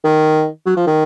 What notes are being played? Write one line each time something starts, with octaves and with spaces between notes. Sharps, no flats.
D#3
F#3
F3
D#3